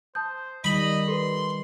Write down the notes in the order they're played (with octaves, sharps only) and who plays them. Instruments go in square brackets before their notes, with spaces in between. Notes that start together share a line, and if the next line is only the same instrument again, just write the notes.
[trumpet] C5 [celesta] A5 D#6 G6
[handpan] D#3 G3 [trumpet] D#5 [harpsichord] B5
[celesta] A4 B4 [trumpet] C6